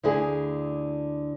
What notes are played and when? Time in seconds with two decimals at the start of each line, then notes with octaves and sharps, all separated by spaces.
0.03 D2 D3 E4 G#4